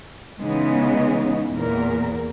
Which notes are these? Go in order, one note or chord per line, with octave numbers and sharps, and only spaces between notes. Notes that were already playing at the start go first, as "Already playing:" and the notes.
C#3 E3 G#3 B3 D#4
E2 A#2 A#4